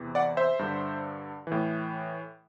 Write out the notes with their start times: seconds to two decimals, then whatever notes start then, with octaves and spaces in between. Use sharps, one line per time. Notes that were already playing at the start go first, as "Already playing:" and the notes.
Already playing: E2 C3 E3
0.15 D5 F#5
0.37 C5 E5
0.59 G2 D3
1.47 A2 E3